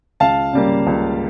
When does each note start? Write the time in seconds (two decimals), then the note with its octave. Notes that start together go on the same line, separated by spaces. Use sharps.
0.20 C#2 F5 A5
0.53 C#3 G3 A#3
0.87 C#2